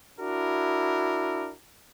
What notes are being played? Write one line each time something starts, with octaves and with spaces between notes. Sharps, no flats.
D4 E4 F#4 A#4